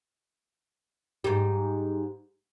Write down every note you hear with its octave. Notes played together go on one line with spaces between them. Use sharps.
G#2 G3